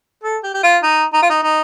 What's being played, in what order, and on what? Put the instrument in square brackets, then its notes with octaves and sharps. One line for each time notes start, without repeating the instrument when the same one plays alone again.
[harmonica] A4
G4
G4
F4
D#4
D#4
F4
D#4
D#4